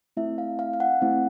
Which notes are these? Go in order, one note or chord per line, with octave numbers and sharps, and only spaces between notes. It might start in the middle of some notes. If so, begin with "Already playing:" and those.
A3 C4 E4 E5
F5
F5
F5
F#5
A3 C4 E4